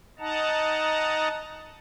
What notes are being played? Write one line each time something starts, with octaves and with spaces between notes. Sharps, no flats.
D#4 D#5 F#5 A5 A#5